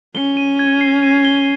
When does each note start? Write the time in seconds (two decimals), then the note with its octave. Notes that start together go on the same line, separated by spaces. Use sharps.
0.15 C#4 G7
0.37 D#7
0.59 G#6
0.81 C7
1.03 D#7
1.25 G7